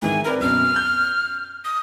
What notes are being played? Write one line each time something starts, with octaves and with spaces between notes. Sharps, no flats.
G#2 D#3 E3 G#5
C4 A#4 B4 D5
F#2 B2 F6
F#6 G6
D#6